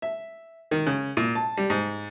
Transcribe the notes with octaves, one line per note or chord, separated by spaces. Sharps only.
E5
D#3
C#3
A#2
A5
G3
G#2